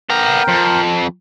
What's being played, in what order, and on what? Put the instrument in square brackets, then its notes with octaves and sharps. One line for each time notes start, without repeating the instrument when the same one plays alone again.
[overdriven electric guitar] B3 A#5 [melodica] A#4 G5
[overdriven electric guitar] F2